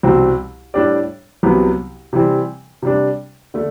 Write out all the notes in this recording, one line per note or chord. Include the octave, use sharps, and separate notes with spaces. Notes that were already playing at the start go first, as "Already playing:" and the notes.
C2 B2 G3 C4 F#4
A2 G3 D4 G4 D5
C2 C3 F#3 B3
C3 E3 G3 C4
C3 G3 D4
D3 A3